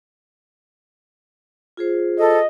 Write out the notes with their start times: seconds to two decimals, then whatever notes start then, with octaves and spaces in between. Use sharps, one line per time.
1.77 F4 G#4 C5
2.19 A4 D#5